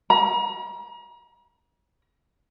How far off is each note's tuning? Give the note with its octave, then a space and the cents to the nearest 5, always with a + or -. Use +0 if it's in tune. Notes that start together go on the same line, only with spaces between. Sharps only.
A#5 +40